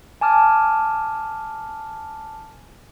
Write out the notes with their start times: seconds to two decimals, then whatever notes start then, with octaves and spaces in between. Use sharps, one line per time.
0.21 G#5 A5 D6 F6